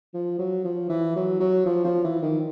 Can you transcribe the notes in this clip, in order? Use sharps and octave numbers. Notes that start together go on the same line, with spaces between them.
F3
F#3
F3
E3
F#3
F#3
F3
F3
E3
D#3